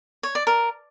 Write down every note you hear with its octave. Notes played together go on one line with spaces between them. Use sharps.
C#5
D5
A#4